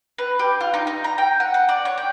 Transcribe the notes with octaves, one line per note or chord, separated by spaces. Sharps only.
B4
G4
F4
D#4
D#4
A#5
G5
F#5
F#5
D5
C#5
G5